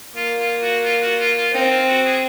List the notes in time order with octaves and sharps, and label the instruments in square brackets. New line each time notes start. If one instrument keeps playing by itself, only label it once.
[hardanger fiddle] A#3 [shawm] F4
[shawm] F4
F#4
F4
F#4
F4
F4
[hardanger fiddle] C4 [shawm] D#4
[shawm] F4
F#4
G#4